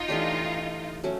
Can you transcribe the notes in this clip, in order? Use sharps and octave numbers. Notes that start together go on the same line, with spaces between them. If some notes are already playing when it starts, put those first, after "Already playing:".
Already playing: D#4 F4
E3 A3 D4 G4
F#3 A3 C#4